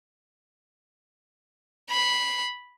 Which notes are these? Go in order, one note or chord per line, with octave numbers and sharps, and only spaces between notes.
B5 C7